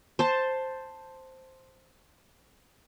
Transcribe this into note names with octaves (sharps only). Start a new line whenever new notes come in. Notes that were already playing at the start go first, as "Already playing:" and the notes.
C5 A5